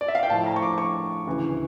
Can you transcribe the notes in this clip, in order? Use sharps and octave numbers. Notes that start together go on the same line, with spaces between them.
D5
E5
F5
G5
A2 F3 A5
A#5
C#6
D6
C#6
D2 C#3 E3